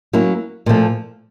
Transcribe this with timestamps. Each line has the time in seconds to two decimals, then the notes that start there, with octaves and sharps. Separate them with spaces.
0.13 F#3 A#3 C#4 E4
0.66 A#2 F3 A3